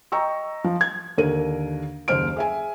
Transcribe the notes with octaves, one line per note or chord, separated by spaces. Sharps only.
D#5 G5 A#5 C#6 E6
F3
G#6
D#2 D3 A#4 D#7
F#1 D#2 C5 F6 D7
G#4 E5 G#5